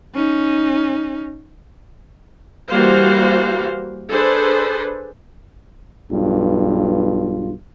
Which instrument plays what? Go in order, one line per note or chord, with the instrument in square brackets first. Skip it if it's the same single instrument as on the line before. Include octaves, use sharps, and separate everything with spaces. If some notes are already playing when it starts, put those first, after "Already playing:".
[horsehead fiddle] C#4 D#4
[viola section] E3 G3 A#3 F#4 C5 F5
D4 G#4 A4 B4 C5
[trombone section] B1 G2 F4